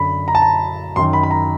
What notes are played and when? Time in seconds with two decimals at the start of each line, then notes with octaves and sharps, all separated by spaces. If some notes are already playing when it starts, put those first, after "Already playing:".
Already playing: F#2 D3 B5
0.28 A#5
0.35 A5
0.42 A#5
0.96 F#2 D#3 C6
1.13 B5
1.23 B5
1.31 A#5